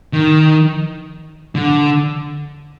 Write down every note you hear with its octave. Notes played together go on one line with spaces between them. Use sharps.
D#3
D3